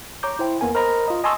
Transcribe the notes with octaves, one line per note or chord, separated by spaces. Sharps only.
C#5 A#5 D6 G6
E4 C5 G5
E2 A#3 B3 A#4 G#5
A#4 C5 D#5 A#5 B5
F4 D#5
D#5 G#5 A5 C6 C#6 E6